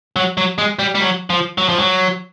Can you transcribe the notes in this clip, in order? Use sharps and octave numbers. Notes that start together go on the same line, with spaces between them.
F#3
F#3
G#3
G3
G3
F#3
F3
F#3
F3
F#3